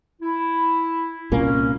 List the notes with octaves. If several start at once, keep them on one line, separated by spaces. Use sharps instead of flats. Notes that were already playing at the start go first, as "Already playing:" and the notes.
E4
C2 A#2 A#3 C#4